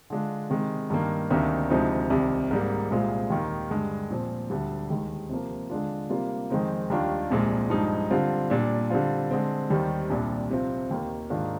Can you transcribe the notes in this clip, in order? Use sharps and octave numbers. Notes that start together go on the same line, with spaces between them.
D3 G#3 D4 F4
C3 D#3 G#3
G2 D#3 A#3
D2 C3 D#3 A#3 D4
D2 C3 F3 G#3 D#4
C2 C3 D#3
G#2 G3 A#3
C2 A#2 G#3 C4 F4
D#2 D#3 A#3
G2 D3 G#3
A#2 F3 C4
D2 D3 G3
D#2 D#3 G#3
C3 F3 A#3
D3 G#3 D4 F4
C3 G3 A#3 F4
F2 D#3 G#3 C4 D#4
D#2 D#3 G3 D4 F4
C2 A#2 F3 G#3
G2 F3 G#3 D#4
D3 G3 C4 F4
A#2 G3 D4
D3 G3 C4 F4
D3 G#3 C4
D#2 D#3 G3 C4
C2 A#2 G3 D4
C3 F3 C4 F4
D#2 D#3 A#3
G#2 D#3 A#3 D4 F4